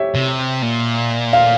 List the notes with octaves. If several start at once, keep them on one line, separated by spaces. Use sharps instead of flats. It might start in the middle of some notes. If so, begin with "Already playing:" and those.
Already playing: G4 C#5 E5
C3
A#2
F5